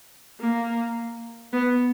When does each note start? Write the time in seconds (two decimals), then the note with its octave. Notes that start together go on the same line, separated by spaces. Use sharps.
0.40 A#3
1.53 B3